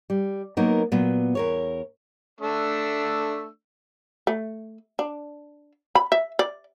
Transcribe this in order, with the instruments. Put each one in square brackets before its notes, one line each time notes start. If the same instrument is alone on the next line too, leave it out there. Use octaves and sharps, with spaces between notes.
[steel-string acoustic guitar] G3
F#3 A#3 B3 D#4 A#4
A#2 F#3 B3
E2 A#4 C#5
[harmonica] A3 D4 E6
[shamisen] A3
D4
B5
E5
D5